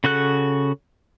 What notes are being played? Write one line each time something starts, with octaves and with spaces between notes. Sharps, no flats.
C#3 F#4 A4 F#6